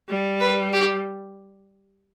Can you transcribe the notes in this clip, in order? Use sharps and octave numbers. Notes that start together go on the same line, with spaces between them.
G3
B4
G4